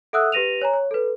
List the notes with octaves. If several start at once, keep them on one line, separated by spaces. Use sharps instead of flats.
A4 E5 F#5 D#6 E6 F#6
G4 B4 A#6 D#7 F7
C#5 G#5 A#5
C#5
A4 B4